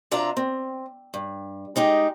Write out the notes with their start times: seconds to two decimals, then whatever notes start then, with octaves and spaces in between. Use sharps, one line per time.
0.11 C3 D4 F4 E5 A#5
0.37 C4
1.14 G2
1.76 G#3 D#4 G4 G#4